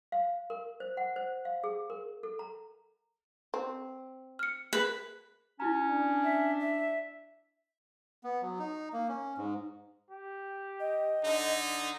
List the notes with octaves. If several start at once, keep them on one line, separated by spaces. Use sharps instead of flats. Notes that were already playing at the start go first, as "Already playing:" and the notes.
F5
A#4
C5
F#5
C5
F5
G#4
A#4
A4
A#5
C4
F6 C#7
G#4 A#4 B4
C#4 E4 F#4 A#5
D4
E5
E5
B3
F#3
D#4
A#3
C#4
G#2
G4
D#5
D3 D#4